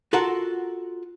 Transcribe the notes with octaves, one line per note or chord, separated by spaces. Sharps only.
F4 F#4 A4 A#4 F#5